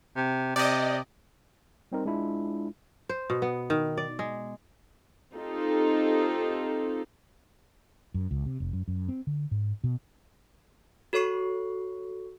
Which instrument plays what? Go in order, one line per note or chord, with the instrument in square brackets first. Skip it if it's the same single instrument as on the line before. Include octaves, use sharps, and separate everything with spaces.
[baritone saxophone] C3
[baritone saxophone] C3 [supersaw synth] D5 D#5
[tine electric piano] G3 C4 D#4 A#4
G#3 D4 E4 F4
[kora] C5
B2
B3
D#3
D5
G#3
[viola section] C4 D#4 F4 G4 A4
[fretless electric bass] F#2
C#2
C3
F1
F#2
F#2
C4
D3
G#2
B2
[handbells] F#4 A4 C#5 C#6 C7